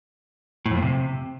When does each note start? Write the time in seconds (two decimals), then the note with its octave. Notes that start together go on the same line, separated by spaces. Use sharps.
0.66 A2
0.71 F2
0.77 A#2
0.82 C3